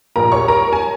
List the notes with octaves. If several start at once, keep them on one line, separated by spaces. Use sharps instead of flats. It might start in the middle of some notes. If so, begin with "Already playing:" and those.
A#1 A#2 A#4 A#5
C#5 C#6
A#4 A#5
G#5